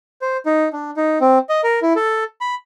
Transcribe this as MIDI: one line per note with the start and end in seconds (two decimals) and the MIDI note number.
0.22 0.37 72
0.46 0.68 63
0.73 0.91 62
0.97 1.18 63
1.21 1.38 60
1.49 1.61 75
1.63 1.79 70
1.82 1.93 64
1.96 2.24 69
2.41 2.55 83